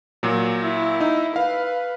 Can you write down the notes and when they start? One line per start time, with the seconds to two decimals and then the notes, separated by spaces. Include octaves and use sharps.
0.23 A#2 F#3
0.63 E4
1.01 D#4
1.36 B4 F5